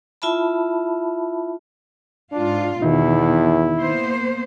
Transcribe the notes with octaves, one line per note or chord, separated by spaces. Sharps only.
E4 F4 E5 A5 B5
G#2 D4 F4
E2 B2 D#3 D#4 E4
A#3 B3 C5